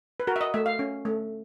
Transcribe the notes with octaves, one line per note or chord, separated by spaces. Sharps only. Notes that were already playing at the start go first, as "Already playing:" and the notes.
B4
F#4 A#4
E5
D#5
A3 E5
F5
C#4
A3